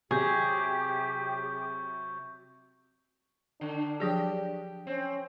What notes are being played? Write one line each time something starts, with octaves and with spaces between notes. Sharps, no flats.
C3 F#3 G4 G#4 C#6 G6
D3 D4
F3 F#3 G4 G#4
C4 C#4